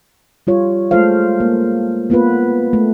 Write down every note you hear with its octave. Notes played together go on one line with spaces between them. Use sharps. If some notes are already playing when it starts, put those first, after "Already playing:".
G3 F4 C#5
G#3 A3 F4 A4 C5 F5
A#3
A#3 B3 F4 B4
A3